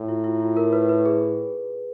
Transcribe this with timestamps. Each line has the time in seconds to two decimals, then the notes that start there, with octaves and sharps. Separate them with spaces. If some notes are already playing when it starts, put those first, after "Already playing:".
Already playing: A2
0.09 F4
0.24 F4
0.40 F4
0.57 A#4
0.72 B4
0.89 B4
1.06 G#4